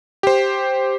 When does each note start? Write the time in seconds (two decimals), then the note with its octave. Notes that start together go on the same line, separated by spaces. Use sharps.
0.23 G4 C5